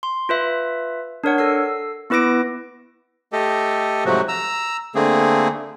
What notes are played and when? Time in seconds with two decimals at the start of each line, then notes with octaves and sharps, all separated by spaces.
0.03 C6
0.29 F4 B4 E5
1.24 D4 A#4 C#5 F#5
1.38 A4 E6 C7
2.10 B3 E4 B4 D6 A#6 D7
3.32 A3 G4 A4 D#5
4.05 G#2 C3 F3 F#3 A3 F#4
4.28 A#5 E6
4.95 D3 A3 A#3 C4 G#4